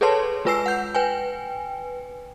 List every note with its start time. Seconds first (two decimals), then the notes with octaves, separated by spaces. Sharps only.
0.01 G#4 A4 B4 C#5 A5 C6
0.45 G#3 F4 B4 G#5 E6 C7
0.66 F#5 G6
0.95 B4 G5 G#5